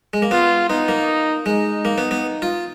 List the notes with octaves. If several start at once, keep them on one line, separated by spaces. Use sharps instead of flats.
G#3
A#3
B3 F4
B3 D#4
A#3
G#3 D#4
A#3
B3
B3
F4